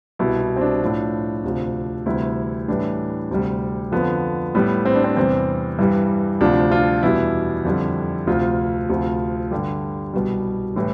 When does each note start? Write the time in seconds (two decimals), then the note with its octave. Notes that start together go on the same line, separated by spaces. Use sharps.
0.19 C2 B2 G3 E4
0.40 E4
0.56 C4
0.61 D4
0.81 A2 F3
1.44 D2 C3 F3
2.06 D2 C3 E3 G3 E4
2.68 A2 E3 G3 D4
3.31 D2 C3 G3
3.92 F2 D3 F3 B3
4.55 A2 G3 B3
4.85 C4
4.95 D4
5.04 C4
5.17 E2 C3 G3 C4
5.79 G2 E3 G3
6.41 D2 C3 F3 D4
6.72 F4
7.03 E2 B2 G3 E4
7.65 F2 D3 G3
8.27 D2 C3 F3 F4
8.89 D2 C3 F3
9.51 G2 D3 G3 G4
10.14 C2 B2 G3
10.76 A2 E3 G3